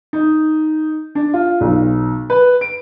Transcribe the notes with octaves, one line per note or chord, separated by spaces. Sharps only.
D#4
D4
F4
B1
B4
D7